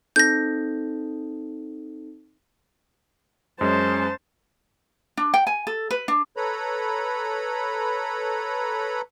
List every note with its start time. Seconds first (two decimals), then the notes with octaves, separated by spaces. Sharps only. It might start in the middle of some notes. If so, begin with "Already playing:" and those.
0.16 C4 D#4 A4 G6 A#6
3.61 F#2 G#3 C#4 C5 A5
5.17 D4
5.34 G5
5.47 G#5
5.67 A4
5.91 B4
6.08 D4
6.37 A4 B4 C#5 A#5 B5